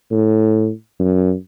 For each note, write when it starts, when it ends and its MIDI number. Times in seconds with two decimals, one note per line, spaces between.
0.11 0.70 45
1.00 1.33 42